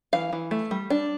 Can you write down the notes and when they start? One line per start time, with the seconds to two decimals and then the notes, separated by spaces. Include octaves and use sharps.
0.13 E3 F5
0.33 E3
0.51 A3
0.71 G3
0.90 D4